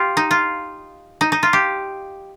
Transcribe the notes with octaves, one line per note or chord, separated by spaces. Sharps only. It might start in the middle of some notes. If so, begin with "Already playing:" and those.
Already playing: F4 G4
D#4
F4
D#4
D#4
F4
G4